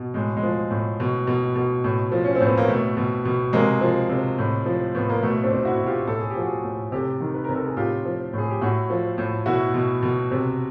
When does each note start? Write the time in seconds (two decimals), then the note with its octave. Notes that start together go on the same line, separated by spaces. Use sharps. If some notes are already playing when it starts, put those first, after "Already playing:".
Already playing: B2
0.14 A2 G#3
0.37 G#3
0.43 F3
0.71 A2
1.00 B2
1.27 B2
1.56 B2
1.84 A2
2.12 F3
2.24 C#4
2.35 C4
2.40 A2
2.46 B3
2.57 A#3
2.68 B2 A3
2.97 B2
3.25 B2
3.53 C3 G#3 A#3
3.81 F3
4.09 C3
4.38 A2
4.66 F3
4.95 A2 B3
5.09 A#3
5.23 B2 A3
5.44 C4 D4
5.51 B2
5.65 E4 F#4
5.79 B2
5.86 F4 G4
6.07 A2 A4
6.19 G#4
6.30 G4
6.36 F3
6.41 F#4 G#4
6.64 A2
6.92 C3 G4 A4
7.20 D#3
7.34 B4
7.44 C3 A#4
7.55 A4
7.66 G#4
7.77 A2 F4 G4
8.05 F3
8.33 A2 G#4
8.50 G4
8.61 A2 E4 F#4
8.90 F3
9.18 A2
9.46 B2 E4 F#4
9.74 B2
10.03 B2
10.31 C3